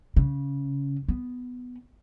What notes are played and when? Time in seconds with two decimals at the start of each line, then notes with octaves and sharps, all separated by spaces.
0.16 C#3
1.08 B3